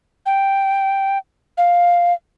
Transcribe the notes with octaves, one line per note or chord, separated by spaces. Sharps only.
G5
F5